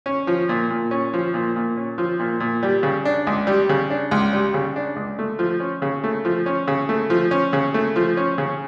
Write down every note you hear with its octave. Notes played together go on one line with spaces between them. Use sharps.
C#4
F3
A#2
A#2
C#4
F3
A#2
A#2
C#4
F3
A#2
A#2
G3
C#3
D4
C#2
G3
C#3
D4
C#2
G3
C#3
D4
C#2
A3
F3
C#4
C#3
A3
F3
C#4
C#3
A3
F3
C#4
C#3
A3
F3
C#4
C#3